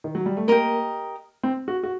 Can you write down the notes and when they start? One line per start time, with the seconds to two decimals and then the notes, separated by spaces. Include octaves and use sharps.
0.04 D#3
0.15 F#3
0.26 G3
0.37 A3
0.48 A#3 G4 A#4 D#5
1.43 C4
1.68 F#4
1.83 F#4